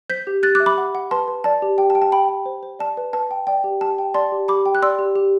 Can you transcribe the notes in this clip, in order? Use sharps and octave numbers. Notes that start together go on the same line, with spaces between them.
C5 G6 B6
G4
G4 F#6 A6
D6 F#6
E5
B5 D6
F#5
F#5
B4 A5 C6
B4
D5 A5
G4
G4 G5
A5
G5
A5
G5 B5
G5
C5
C5
D5 A5
B4
B4 A5
G5
D5 G5
G4
G4 A5
G5
D5 A5 C6
G4
G4 B5 D6
G5
F#6
D5 C6 E6
G4
G4